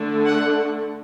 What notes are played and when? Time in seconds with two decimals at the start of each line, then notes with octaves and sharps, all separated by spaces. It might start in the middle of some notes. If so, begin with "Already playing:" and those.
Already playing: D3 A3 D4
0.25 F#5